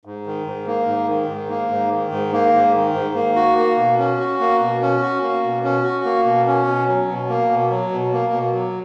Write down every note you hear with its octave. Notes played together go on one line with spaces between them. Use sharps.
G#2
D#3
G#2
A#3
G#2
D#3
G#2
A#3
G#2
D#3
G#2
A#3
G#2
D#3
G#2
A#3
F#4
A#3
B2
C#4
F#4
A#3
B2
C#4
F#4
A#3
B2
C#4
F#4
A#3
B2
C#4
B2
F#3
B2
A#3
B2
F#3
B2
A#3
B2
F#3